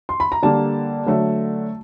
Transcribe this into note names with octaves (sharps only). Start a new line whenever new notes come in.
C6
B5
A#5
D3 G3 A#3 A5
D3 F#3 A3